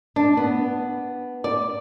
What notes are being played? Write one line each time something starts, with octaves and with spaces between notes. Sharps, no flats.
D4
B3
D5